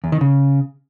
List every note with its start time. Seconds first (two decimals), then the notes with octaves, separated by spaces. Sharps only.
0.04 E2
0.12 D#3
0.21 C#3